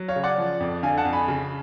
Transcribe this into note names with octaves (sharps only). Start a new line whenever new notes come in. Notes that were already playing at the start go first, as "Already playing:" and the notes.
Already playing: F#3
C#5 F5
C#3
D5 F#5
F3
F2
D3 F5 G#5
F#5 A5
F2
G#5 B5
C#3